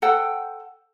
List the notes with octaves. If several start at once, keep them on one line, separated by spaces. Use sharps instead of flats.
A4 C5 F#5 G5